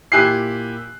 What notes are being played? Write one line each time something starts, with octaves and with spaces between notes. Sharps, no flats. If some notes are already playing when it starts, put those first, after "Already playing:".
A#2 E4 G4 G#5 F#6 C7